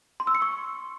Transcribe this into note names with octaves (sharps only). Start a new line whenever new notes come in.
C6
E6
C#7
C#6